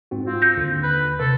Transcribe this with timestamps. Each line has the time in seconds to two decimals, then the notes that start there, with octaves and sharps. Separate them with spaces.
0.11 G#2 C4 F#4
0.27 C4 F4
0.42 G6 A#6
0.57 D#2 D3
0.83 B4
1.20 C3 A4 B4